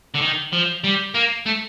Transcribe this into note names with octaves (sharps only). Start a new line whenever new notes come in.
D3
D#3
F3
G3
A#3
A3